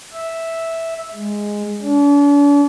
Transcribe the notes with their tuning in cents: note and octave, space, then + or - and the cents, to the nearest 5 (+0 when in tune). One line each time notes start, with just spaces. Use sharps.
E5 -5
G#3 -5
D4 -40